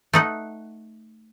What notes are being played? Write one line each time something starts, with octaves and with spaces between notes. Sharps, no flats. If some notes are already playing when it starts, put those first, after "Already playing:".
A3 D#4 F#5